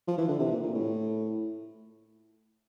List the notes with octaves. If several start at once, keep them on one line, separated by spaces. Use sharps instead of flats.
F3
E3
D3
C3
A#2
A#2
A2